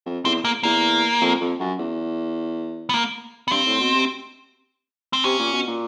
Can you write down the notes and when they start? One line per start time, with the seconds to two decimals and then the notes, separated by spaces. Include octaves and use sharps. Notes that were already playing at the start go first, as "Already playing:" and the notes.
0.06 F2
0.25 E2 C4
0.45 A#3
0.63 E2 A#3
1.21 F2
1.41 F2
1.60 F#2
1.79 E2
2.89 B3
2.94 A#3
3.48 B3
3.51 G2 C4
3.66 A2
3.80 B2
3.95 C3
5.13 C4
5.24 C3 C#4
5.39 A#2
5.53 B2
5.67 A#2